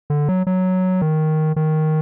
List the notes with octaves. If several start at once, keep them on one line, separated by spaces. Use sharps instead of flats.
D3
F#3
F#3
D#3
D#3